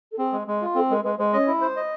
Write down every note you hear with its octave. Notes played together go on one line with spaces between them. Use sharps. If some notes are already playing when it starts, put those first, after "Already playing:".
A4
C4 G#4
G#3
G#3
F4
C4 A4
G#3 A#4
G#3 B4
G#3 C5
C#4 C#5 D#5
E4
C5
D#5